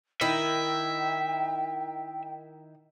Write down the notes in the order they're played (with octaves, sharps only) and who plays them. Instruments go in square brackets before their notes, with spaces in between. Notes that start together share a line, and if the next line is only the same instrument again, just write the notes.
[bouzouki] D#3 E4 [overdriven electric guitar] E5 [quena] G5